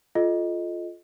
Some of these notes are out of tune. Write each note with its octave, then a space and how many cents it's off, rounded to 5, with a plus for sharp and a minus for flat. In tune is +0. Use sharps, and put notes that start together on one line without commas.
F4 +0 A4 -30 D#5 +0